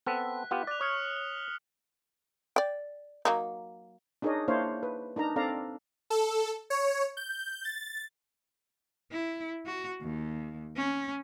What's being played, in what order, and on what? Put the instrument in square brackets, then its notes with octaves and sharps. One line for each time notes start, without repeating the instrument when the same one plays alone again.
[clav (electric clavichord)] B3 C4 A4 [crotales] F#6 B6
[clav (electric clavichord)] B3 F4 G4
[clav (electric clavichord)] D5 [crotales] F#6 F7
[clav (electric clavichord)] C#5 [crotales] D#6 F6 C#7
[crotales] G7
[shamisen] D5 G5
F#3 A#3 D#4
[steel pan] D4 D#4 G#4 A#4 C#5 D#5
A#3 D4 E4 C5 C#5 F5
B4
D4 D#4 A#4 A#5
C4 D4 A4 D5 F5 A#5
[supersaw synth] A4
C#5
G6
A6
[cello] E4
F#4
D#2
C#4